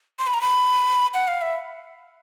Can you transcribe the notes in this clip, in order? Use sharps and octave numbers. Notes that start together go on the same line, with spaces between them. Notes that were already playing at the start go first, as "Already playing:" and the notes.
C6
B5
A#5
B5
F#5
F5
E5